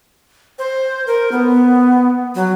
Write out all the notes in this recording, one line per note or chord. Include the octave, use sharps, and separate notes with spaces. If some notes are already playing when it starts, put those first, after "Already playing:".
C5
A#4
B3
F#3